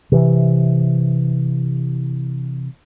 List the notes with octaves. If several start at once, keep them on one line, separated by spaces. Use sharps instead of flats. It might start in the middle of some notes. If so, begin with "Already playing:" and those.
C3 E3